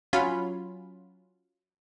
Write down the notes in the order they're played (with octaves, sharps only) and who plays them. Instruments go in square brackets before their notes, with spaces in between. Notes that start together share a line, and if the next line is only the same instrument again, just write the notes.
[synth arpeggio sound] F#3 C#4 F4 B5